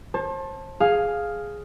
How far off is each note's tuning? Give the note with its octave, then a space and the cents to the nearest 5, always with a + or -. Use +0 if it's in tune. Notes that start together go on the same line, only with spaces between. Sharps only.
C5 +40 A5 +0
G#4 +0 F5 +5